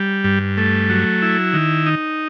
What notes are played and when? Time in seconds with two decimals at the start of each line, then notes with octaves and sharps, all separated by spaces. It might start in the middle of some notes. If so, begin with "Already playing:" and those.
Already playing: G3
0.24 G2
0.57 A3
0.89 F#3
1.22 E4
1.53 D#3
1.86 D#4